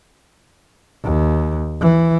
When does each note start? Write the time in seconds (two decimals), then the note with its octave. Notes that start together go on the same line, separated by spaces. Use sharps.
1.03 D#2
1.80 E3